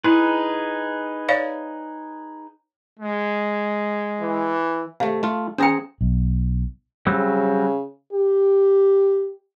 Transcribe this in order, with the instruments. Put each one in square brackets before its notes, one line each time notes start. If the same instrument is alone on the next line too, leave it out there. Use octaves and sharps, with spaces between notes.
[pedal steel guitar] D#4 G#4 B4 [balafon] E4
[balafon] C#5 D5 F5
[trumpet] G#3
[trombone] E3
[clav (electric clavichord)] C3 A3 [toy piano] F5
[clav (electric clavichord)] A3 F4
[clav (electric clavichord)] C4 G#4 A#5 [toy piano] C#4 G5
[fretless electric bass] B1
[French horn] C#3 [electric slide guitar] F#3 G3 C4
[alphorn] G4